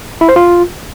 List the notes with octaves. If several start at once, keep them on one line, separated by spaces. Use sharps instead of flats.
E4
C5
F4